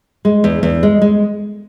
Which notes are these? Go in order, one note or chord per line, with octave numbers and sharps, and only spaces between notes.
G#3
E2
E2
G#3
G#3